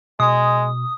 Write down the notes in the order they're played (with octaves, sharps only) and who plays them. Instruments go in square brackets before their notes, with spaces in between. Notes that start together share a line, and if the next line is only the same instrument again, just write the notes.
[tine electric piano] B2 [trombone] G#3 [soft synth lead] D#6